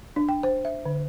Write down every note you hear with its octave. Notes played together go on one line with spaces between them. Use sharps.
D4
G5
C5
E5
D3